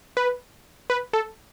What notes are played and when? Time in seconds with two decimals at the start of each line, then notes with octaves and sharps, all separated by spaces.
0.17 B4
0.90 B4
1.13 A4